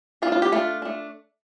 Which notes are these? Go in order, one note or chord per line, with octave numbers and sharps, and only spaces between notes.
A3 D4 F4
F4
G4
A3 D4 F4
A3 D4